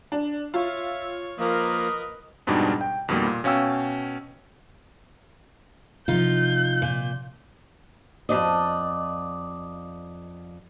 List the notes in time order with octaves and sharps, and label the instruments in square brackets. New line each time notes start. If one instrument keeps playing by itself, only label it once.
[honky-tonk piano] D4
[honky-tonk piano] F4 [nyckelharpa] C#5 [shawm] E5
[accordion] F3 A#3 [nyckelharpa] A#4 B4 [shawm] D#5
[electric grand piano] F2 G#2 B2 G3 D4 D#4
G5
F2 B2 D#3 F3 G3 A#3
A#2
B2 C#4 F5 G5 E6
[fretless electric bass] C3 F3 [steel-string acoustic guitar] D#4 F4 [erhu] G6
[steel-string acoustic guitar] A#2
F2 C3 D5 D#5